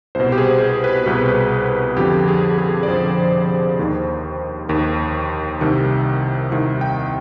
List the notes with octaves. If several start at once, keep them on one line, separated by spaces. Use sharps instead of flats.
C2 B2 C5
G4
G#4
G4
B4
C2 B2
F2 D3 F3 G4
G#4
G#4
D5
F2 D3 F3 C5
D#2 D#3
D#2 D#3
C2 C3 D#3
C2 C3 D#3
G5